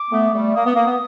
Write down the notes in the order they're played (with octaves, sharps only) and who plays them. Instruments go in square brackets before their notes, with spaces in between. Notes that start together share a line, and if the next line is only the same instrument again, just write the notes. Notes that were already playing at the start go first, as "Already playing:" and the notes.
Already playing: [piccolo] D6
[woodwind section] A3 B3
G3 A3
[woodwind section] A#3 [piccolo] D#6
[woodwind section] B3
A#3
B3